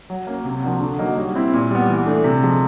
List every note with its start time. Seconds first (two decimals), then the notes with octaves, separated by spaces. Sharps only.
0.10 F#3
0.27 A#3 C#4
0.45 C3
0.62 F3 A#3 D4 F#4
0.80 D3
0.98 F#3 A#3 D#4 F#4
1.17 G3
1.35 C4 E4
1.53 A#2
1.71 G3 B3
1.89 E3
2.07 A3 D4
2.24 C3
2.43 F3 G#3